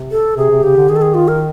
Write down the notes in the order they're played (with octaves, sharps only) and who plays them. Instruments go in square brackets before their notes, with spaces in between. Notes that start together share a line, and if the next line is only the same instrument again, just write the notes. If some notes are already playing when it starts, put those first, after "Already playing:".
Already playing: [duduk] C3
[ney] A4
[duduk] C3 [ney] G#4
[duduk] C3
[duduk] C#3 [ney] G4
[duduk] D3
[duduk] D#3 [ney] G#4
[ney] A4
G#4
F4
A#4